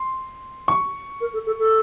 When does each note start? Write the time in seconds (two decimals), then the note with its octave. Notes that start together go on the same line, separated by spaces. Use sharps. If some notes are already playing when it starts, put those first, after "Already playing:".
Already playing: C6
0.68 C#6
1.21 A#4
1.33 A4
1.46 A4
1.59 A4